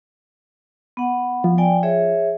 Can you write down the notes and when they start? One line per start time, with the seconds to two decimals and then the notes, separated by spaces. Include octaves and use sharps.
0.97 B3 F#5
1.44 F3
1.58 D5 G5 G#5
1.83 G#4 C#5 E5